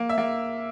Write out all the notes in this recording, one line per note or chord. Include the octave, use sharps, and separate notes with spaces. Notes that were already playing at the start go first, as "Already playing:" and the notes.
Already playing: A#3
E5
A#3